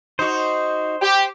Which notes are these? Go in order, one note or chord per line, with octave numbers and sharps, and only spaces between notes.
D#4 F#4 C5
G4